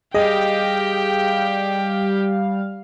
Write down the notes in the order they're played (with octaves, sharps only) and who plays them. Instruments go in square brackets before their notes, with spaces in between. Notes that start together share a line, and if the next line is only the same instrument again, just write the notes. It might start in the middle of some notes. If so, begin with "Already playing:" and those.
[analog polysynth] G3 F5 [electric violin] G4 G5 [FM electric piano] G#4 [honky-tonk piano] D#5